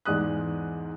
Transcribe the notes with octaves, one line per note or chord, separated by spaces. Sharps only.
E2 G#2 G#3 D5 D#6 F#6